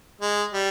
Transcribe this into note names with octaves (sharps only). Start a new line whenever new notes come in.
G#3
G3